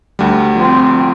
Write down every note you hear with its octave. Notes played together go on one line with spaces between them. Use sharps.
D2 G3
F3 C4